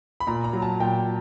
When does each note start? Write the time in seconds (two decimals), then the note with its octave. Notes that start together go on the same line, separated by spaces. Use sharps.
0.20 B5
0.27 A#2 A#5
0.44 A#5
0.53 F#3
0.62 A5
0.80 A#2 G5